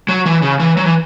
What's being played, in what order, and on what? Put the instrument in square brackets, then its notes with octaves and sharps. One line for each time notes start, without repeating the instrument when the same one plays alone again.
[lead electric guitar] F#3
E3
C#3
E3
F#3
E3